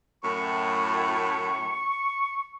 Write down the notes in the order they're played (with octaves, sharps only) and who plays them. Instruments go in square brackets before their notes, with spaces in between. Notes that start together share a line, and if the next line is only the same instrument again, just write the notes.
[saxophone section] F#2 A2 [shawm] C#6